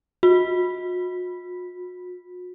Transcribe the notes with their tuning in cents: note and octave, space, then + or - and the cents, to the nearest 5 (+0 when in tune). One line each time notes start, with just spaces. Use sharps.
F#4 -45